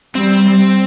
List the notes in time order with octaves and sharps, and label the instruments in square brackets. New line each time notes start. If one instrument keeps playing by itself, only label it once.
[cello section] G3 [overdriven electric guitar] C4